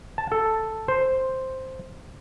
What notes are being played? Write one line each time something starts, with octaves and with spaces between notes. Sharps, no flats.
A5
A4
C5